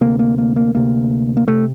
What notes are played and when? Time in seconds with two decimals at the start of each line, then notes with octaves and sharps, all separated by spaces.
0.01 D2 C3 A#3
0.19 A#3
0.38 A#3
0.56 A#3
0.75 D2 C3 A#3
1.37 A#3
1.48 C3 A3